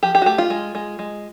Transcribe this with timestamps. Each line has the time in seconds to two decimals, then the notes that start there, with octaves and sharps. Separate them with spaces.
0.03 F3 G4
0.15 G4
0.22 F#4
0.26 A3 G4
0.38 F4
0.50 G#3
0.75 G#3
0.99 G#3